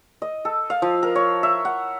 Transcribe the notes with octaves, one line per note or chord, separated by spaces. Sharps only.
D#5
A4
F5
F3
A#4
C#5
E5
F#5